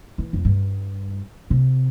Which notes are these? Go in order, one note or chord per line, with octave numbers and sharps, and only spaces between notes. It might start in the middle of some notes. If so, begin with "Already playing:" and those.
E3
F2
G2
C3